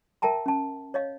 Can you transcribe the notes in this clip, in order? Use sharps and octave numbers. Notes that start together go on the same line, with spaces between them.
A#4 E5 G5 A5 A#5
C#4 A5
C#5 D#5 F5